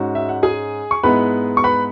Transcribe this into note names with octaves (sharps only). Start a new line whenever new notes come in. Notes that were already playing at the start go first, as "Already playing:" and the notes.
Already playing: G#2 G#3 C#4 F#4
E5
F#5
G#4 G#5
C#6
G#2 G#3 B3 E4 B4 B5
C#6
B4 B5